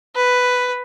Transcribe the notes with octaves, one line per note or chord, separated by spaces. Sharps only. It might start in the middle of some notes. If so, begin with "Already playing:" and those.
B4